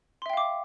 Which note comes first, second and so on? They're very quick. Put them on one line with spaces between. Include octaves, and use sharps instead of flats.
C6 E5 G5 F5 D6